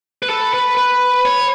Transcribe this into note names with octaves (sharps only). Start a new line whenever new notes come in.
B4
A4 B5
B4
B4
C#5